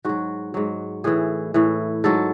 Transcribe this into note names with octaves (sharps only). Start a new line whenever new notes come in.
G#2 F#3 F#4
G#2 F#3
A2 E3 G#4
A2 E3
G#2 F#3 A4